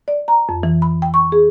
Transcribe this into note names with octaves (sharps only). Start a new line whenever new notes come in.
D5
A#5
F2
E3
B5
G5
C#6
G#4